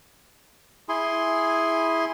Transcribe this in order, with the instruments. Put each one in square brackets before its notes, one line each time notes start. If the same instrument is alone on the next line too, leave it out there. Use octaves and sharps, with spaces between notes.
[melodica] E4 G#4 G#5 C6